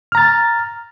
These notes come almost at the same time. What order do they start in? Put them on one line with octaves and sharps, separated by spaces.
F6 A#5 A6